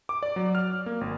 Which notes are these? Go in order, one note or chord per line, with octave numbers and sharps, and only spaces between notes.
D6
D5
F#3
F6
A#3
G#1